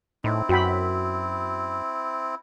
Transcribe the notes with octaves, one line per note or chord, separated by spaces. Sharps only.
A2 C4 D#4 E4
F#2 F#4 G5 B5